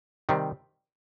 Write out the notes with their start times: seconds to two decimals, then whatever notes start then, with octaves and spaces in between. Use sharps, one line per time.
0.29 C3 D#3 G3 C4